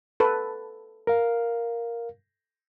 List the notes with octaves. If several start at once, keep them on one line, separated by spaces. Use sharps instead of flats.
A4 B4
A#4 F5